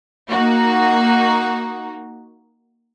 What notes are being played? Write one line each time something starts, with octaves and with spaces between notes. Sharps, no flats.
A#3 D#4 F#4